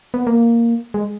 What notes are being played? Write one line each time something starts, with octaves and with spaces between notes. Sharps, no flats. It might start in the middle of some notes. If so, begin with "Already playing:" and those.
B3
A#3
G#3